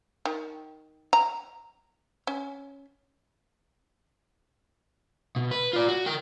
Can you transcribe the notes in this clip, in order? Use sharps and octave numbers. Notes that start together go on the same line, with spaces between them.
D#3
A#5
C#4
B2
B4
F4 D5
F#4
A#4 G5